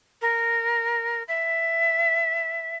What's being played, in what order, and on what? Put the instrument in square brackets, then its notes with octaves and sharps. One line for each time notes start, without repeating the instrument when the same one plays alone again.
[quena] A#4
E5